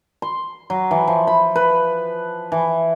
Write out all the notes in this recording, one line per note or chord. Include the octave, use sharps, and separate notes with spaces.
C6
F#3
E3
F3
B5
B4
E3